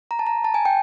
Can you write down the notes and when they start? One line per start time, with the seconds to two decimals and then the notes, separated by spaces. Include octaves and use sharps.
0.11 A#5
0.19 A5
0.27 A#5
0.44 A5
0.54 G#5
0.65 G5